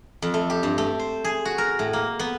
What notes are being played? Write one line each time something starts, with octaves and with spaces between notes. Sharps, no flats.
F2
A3
G4
G2
A3
C5
G#4
F#4
A#4
A2
A#3
B3